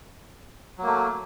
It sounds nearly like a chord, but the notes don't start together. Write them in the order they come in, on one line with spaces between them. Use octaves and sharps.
F#3 A#3 A3